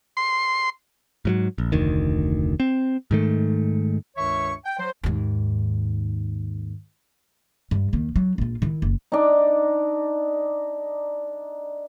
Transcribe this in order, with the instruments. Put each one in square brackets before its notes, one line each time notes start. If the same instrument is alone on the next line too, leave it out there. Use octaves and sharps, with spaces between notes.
[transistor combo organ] C6
[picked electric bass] G#2 F3 F#3
A#1
F1 D2 D#3
C4
G#2 D#3 A3
[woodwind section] C#2 G2 D#3 C#5 E5 C#6
G5
F#3 C5
[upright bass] D#2 G#2
G2
D#2 D#3
F#3
A#1 F4
D#3 E4
F#1
[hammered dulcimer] D4 D#4